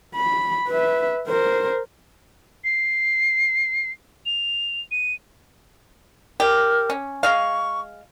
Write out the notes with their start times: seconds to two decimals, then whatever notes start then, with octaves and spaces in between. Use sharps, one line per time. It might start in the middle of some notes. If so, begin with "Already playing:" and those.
0.15 B5
0.68 B4 E5
1.28 A#4 C5
2.64 C7
4.26 F7
4.91 D#7
6.40 G4 A#4
6.90 C#4
7.23 G#3 F5 C#6